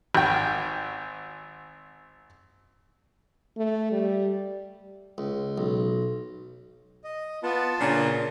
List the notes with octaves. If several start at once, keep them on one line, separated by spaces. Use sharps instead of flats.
G#1 G5
A3
G3
C#2
B1
D#5
B3 F4 A5
A#2 C#3 D4